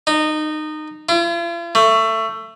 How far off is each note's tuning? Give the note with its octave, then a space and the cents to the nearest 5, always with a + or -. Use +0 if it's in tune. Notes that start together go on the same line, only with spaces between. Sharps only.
D#4 -20
F4 -45
A3 +20